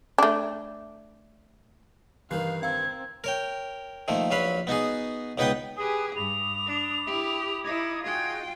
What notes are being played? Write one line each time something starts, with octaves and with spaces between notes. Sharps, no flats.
A3 D4
G2 D#3 E3 F5 F#6 C7
C4 F5 A#5 E6 G#6
A#4 C#5 G5
D#3 F3 A3 A#3
A#1 F#3 B4 F5 B5
B3 D#4 F#4 G#4
C#2 B3 D#4 B4 F#5 G5
G4 G#4 B4 G#5 D#6
G2 B5 D6 D#6 F7
D4
E4 G4
D#4 E4 G#6
D#4 F4 F#4 G#4 G5 G#6